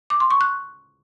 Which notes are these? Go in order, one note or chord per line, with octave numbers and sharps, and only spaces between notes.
D6
C6
C#6
F#6